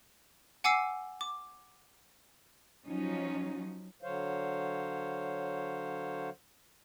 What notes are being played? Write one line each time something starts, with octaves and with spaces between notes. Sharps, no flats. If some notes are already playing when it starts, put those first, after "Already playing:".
F#5 G#5 D6 E6 C7
D6
F3 F#3 C#4 D#4
D3 F#3 C5 C#5 F5